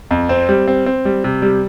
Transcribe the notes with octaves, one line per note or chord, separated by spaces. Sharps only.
F2
C4
G3
C4
C4
G3
C3
G3